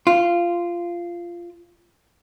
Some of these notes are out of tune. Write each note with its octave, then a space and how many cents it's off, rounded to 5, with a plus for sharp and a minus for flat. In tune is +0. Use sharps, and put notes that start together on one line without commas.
F4 -15